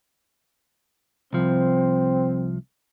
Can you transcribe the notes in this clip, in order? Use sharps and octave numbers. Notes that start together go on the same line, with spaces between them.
C2 F3 C4